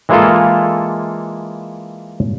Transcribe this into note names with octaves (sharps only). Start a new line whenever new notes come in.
E3 G#3 A#3 E4 F4 A4